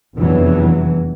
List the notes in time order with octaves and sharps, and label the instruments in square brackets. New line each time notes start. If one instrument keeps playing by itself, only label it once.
[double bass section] F1 E2 G2 E3 F#3